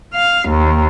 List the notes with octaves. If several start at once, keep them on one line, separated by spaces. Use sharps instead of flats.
F5
D#2